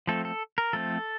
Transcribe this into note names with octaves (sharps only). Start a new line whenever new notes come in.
F3 A3 C4 A4
A4
A#4
F3 A3 C4 A4